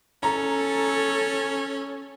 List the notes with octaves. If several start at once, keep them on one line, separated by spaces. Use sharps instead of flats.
C#4 A4 A#5